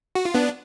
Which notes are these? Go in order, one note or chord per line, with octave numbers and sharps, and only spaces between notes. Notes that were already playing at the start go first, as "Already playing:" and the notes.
F#4
F4
B3 D4